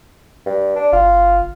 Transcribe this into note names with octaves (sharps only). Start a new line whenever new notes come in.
G2
D4
G1 F4